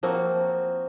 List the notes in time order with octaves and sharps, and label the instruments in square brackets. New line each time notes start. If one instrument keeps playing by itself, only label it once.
[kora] F3 A#3 C4 F#4